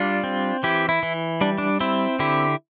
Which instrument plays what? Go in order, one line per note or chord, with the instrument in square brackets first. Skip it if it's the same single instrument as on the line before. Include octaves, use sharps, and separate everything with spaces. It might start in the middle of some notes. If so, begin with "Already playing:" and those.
Already playing: [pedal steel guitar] G3 D4 F4
C4
E3 E4 G4
E4
E3
G3 D4
D4
C4 E4
D3 E4 G4